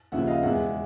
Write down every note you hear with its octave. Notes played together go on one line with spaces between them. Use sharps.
D#2 C#3 F3 E5 F#5
D#5 F5
E2 B2 G#3 E5 F#5